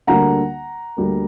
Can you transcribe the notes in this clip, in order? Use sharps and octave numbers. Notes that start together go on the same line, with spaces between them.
D2 D3 G3 A#3 F#5 A#5
D2 D3 G3 A#3